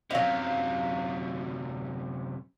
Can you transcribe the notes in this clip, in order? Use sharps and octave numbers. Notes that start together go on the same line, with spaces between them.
F#2 C3 F#3 F5